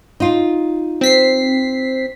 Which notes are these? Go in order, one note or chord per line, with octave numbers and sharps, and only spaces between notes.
D#4 F4
C4 B6 C7